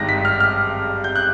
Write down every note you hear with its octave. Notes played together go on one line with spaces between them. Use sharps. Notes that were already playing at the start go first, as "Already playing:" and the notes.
Already playing: G#1 G2 D#3 G#3 A#6
B6
F6
F6
G6
F#6